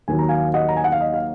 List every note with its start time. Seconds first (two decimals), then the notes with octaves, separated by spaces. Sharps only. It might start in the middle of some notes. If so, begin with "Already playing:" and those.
0.08 D#2 D#3 F#3 G#5
0.19 A#5
0.29 F5 G#5
0.54 D#5 F#5
0.69 A#5
0.77 G#5
0.84 F#5
0.92 F5
1.01 D#5
1.14 F5